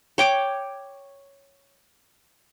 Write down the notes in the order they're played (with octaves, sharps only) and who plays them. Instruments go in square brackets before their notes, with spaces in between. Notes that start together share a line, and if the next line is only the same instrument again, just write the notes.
[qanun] C#5 G5 D6